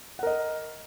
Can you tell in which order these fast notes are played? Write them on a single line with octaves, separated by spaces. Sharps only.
F#5 A#4 D#5